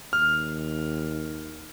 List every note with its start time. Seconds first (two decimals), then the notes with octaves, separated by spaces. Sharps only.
0.13 D#2 F6